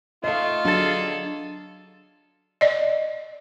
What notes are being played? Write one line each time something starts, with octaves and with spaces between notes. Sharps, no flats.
A3 F4 D#5 F5
F#3 D4 G#4 A4 A6
D5 D#5